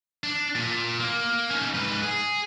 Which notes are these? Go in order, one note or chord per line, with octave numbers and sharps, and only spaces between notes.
D4
A#2
A#3
C#4 D#4
G#2 B4
G#4